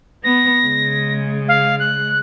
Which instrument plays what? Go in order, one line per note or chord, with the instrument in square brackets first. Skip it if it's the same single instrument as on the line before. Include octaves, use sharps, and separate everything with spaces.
[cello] B3 [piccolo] A#6
[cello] C#3 G#3
[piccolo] F5
F#6